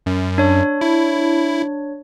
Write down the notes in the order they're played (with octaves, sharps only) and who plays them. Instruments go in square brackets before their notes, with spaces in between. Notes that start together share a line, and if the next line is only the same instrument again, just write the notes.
[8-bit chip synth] F#2
[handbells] D4 C#5
[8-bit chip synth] E4